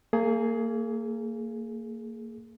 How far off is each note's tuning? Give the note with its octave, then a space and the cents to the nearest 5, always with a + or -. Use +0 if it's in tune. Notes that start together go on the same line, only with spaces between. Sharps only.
A#3 -30 G#4 +15